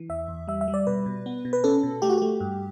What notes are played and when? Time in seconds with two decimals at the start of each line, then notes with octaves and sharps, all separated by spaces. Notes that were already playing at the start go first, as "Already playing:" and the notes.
Already playing: E3
0.09 E2 E5
0.28 E2
0.48 G3 E5
0.61 E5
0.68 G3
0.74 D5
0.87 B2 B4
1.06 B2
1.26 B3
1.45 B2
1.53 B4
1.64 C#4 A4
1.83 B2
2.02 A3 G4
2.10 F#4
2.18 A3 G4
2.40 G2